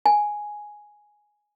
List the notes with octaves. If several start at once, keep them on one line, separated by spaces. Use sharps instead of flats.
G#5